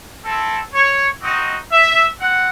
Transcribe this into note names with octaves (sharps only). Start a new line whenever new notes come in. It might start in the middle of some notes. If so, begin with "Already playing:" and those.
C4 E4 A4
C#5
C4 D#4 F#4 D#5
E5
C4 F#5